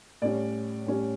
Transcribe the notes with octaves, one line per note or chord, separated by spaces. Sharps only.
A2 G3 C#4 D5
A2 G3 C#4